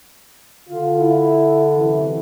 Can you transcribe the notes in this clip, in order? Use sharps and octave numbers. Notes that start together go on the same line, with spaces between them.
D3 F4
E4
F#2 C3 E3